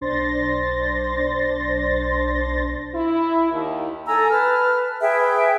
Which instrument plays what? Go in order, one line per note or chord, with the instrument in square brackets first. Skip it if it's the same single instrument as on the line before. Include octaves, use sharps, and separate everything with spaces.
[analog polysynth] B1 D4 C5 C6 A6 A#6
[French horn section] E4
D#2
[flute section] A4 G#5 A#5 E6
B4 A5 F6
G#4 B4 E5 G5